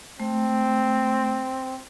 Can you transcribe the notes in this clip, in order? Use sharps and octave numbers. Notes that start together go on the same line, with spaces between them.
A3 C4